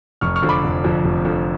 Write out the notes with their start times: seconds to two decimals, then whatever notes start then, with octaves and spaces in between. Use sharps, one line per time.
0.21 F1 C#6 F6
0.36 C#6 F6
0.42 F2 D3 F3
0.49 B5 D6
0.64 F1
0.84 F2 D3 F3
1.05 F1
1.25 F2 D3 F3